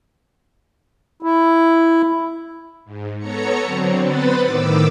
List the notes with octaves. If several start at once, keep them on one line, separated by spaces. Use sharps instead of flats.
E4
G#2
B3 A4 C#5 A#5 C#7
D3 F#3 C4
B3 B4 C5 F#5 B5 A6
A2 D#3 D6 E6